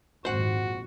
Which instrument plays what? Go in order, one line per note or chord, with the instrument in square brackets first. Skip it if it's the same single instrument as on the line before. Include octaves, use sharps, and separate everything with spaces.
[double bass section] G#1 F2 A#2 [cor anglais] F#4 [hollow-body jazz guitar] C5 F#5